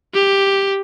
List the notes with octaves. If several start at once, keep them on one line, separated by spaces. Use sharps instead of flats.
G4